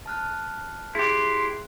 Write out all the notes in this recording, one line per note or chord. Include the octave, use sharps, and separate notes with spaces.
A5 F6 F#6
E4 G4 G#4 C6 F#6